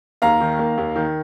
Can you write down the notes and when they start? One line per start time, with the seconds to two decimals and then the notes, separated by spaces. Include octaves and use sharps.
0.22 D#2 F5 A#5
0.40 D#3
0.59 A#3
0.78 D#2
0.96 D#3